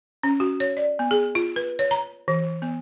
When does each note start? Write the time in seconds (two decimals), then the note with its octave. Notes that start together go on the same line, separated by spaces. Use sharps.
0.23 C#4
0.40 F#4
0.60 C#5
0.77 D5
0.99 B3
1.11 G#4
1.35 F4
1.56 B4
1.79 C#5
1.91 A#5
2.28 E3
2.62 B3